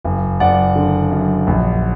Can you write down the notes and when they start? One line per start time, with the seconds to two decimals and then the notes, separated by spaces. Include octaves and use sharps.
0.05 F#1
0.40 F#1 D5 F#5
0.76 D3
1.11 F#2
1.47 A#1